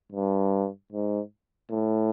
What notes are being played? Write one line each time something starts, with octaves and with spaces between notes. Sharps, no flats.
G2
G#2
A2